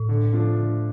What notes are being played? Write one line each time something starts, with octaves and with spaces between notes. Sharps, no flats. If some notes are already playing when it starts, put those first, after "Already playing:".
Already playing: A2
D3
F3 A3 D4 F4
D3